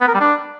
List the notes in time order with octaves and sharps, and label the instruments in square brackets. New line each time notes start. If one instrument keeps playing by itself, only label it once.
[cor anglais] B3
A#4
G3
D4